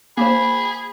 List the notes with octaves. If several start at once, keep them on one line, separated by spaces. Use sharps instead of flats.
A#3 G#4 C5 B5